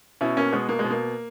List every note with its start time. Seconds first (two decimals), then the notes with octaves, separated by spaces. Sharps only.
0.21 B2 C#4 E4
0.37 A#3 C#4
0.53 B2 G#3 B3
0.69 A#3
0.79 G#3
0.84 B2
0.91 A#3